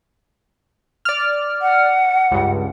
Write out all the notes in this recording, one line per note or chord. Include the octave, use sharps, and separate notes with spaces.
D5 F6
F#5
C#2 G2